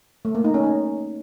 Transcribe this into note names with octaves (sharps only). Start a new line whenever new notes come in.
A3
A#3
D#4
C#4
D#4